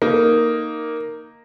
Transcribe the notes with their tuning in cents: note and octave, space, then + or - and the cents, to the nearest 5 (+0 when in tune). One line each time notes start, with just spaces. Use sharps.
A#3 +0 D#4 +0